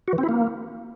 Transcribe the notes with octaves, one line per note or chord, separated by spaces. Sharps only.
F#4
E3
C4
E4
A#3